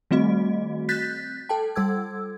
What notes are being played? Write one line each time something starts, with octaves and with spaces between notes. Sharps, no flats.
D#3 G3 A3 C4 F#4 D#5
F#6 G6 A6 B6
A4 G5 A5
G3 A4 E6 G#6